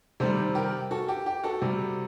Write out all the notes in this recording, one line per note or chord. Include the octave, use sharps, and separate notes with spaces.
C3 D#3 G3 A4 C5
G4 A#4
F#4 A4
G4
G4
F#4 A4
C3 G3